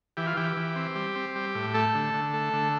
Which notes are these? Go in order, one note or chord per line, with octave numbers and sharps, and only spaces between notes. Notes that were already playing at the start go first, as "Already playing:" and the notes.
E3 G4
F4
E3 G4
E3
C4
G3
C4
G3
A2
A3 A4
D3
D3
A3
D3